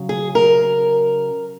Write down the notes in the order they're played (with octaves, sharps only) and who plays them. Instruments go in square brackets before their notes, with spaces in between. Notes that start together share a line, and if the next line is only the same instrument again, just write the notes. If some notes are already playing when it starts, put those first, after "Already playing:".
Already playing: [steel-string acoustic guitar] C#3 F#3
G#4
A#4